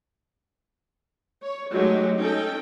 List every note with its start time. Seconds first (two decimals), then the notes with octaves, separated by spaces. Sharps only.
1.41 C#5
1.72 F#3 G#3 A3 D#4 G4
2.17 C#4 D#4 A4 G5